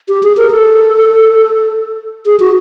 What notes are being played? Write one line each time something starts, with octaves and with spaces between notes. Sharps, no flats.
G4
G#4
A#4
A4
G#4
F#4